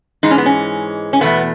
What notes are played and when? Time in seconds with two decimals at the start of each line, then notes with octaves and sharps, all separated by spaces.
0.23 G#2 E3 G#3 D#4
0.31 C#4
0.38 B3
0.46 C#4
1.13 C#4
1.21 E2 B2 A3 B3